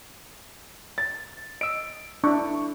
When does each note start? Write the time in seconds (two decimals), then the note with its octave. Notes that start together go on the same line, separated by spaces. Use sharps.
0.98 A6
1.61 D#5 E6 D7
2.24 D4 E4 C#6